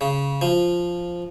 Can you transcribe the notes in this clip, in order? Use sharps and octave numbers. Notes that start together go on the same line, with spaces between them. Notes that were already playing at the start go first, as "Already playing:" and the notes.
C#3
F3